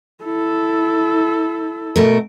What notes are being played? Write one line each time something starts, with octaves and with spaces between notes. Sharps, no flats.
E4 A4
B2 A3 A#4